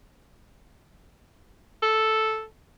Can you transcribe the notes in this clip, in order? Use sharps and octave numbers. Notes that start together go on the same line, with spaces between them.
A4